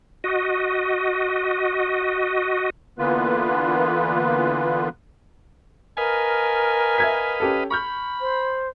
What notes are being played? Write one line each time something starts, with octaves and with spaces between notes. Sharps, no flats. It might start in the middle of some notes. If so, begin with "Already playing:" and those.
F#4 D#5
D3 E3 A#3 B3 F4 B4
A#4 B4 D#5 F5 G#5
E5 G#6 B6
C#4 G4 A4
B5 C#6 F6 G6
C5